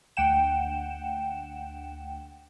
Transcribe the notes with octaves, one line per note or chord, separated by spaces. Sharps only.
D2 F#5 G5 E7